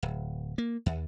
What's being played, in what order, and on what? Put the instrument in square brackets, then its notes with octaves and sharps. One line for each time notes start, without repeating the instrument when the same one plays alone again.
[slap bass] D1
A#3
D#2